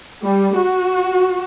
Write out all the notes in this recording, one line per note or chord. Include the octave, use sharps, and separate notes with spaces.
G3
F#4